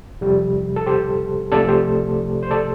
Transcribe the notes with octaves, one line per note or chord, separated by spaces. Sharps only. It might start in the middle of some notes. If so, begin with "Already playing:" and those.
F2 C3 G3
A4
G4 C5
C2 C3 F3 A3 A4 D5
G4 C5
C5
A4 D5